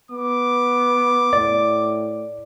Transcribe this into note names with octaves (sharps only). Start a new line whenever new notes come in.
B3 D6
A2 D5